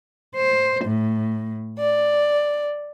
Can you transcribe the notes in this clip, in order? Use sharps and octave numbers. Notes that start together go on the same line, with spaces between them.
C5
A2
D5